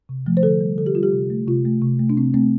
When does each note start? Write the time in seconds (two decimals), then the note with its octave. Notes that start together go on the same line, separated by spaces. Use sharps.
0.09 C3
0.26 F3 A3
0.37 C5
0.43 D3 A4
0.61 G3
0.78 D3 A4
0.86 G4
0.95 G3 F4
1.03 G4
1.13 C3
1.30 A3
1.48 C3 F4
1.65 A3
1.82 C3
1.99 A3
2.10 D4
2.17 C3 C4
2.34 A3 C4